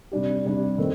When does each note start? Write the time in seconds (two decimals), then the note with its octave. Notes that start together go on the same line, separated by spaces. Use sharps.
0.12 C3 G3 D4 G4
0.44 C3 G3 D4 G4
0.78 D#3 A3 C4